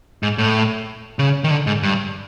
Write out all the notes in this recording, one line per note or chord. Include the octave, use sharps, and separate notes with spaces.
G#2
A2
C#3
D#3
D3
G#2
G2